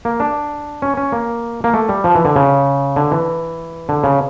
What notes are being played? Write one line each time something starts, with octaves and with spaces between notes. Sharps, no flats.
A#3
D4
C#4
C#4
A#3
A#3
A3
G3
F3
E3
D3
C#3
D3
E3
D3
C#3